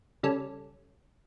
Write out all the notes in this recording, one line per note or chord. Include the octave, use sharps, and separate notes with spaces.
C#3 G3 C#4 A4